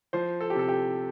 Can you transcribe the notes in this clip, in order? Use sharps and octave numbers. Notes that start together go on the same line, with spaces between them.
F3 C5
A4
G4
C3 A4
G4